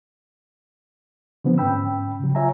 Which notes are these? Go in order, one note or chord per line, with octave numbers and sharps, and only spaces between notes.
D3 F3 B3 C4
G#2 C#4 G5 B5 E6
C#3 F#3
F4 C#5 E5 G#5 A#5